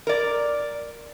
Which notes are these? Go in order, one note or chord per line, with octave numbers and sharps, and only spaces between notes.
A#4 D5